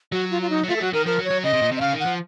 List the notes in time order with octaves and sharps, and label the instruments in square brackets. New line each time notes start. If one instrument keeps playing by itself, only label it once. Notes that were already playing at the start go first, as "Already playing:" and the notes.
[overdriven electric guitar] F#3 [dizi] F#4
[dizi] F4
F4
D#4
[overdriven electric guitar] F#3
[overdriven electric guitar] A3 [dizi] F4
[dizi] A4
[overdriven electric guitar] F#3 [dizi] F#4
[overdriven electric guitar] D#3 [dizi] A#4
[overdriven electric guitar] F3 [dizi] A#4
[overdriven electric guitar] F#3
[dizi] C#5
[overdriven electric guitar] F#3
[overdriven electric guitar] C#3 [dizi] D#5
[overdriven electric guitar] C3
A#2
C3
[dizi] D#5
[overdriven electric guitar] C#3 [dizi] F5
[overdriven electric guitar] D#3
[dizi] F#5
[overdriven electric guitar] F3